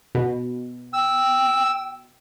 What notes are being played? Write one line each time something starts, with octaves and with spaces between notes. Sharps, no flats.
B2
G5 E6